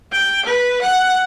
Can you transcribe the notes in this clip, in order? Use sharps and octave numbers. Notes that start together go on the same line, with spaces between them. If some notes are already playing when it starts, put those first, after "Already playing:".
G5
B4
F#5